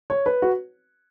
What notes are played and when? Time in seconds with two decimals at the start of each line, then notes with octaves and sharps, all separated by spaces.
0.10 C#5
0.26 B4
0.42 F#4